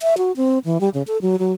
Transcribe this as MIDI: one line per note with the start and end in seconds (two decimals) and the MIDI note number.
0.01 0.15 76
0.18 0.32 66
0.37 0.59 60
0.65 0.80 52
0.81 0.89 55
0.94 1.03 49
1.07 1.20 69
1.22 1.36 54
1.39 1.53 54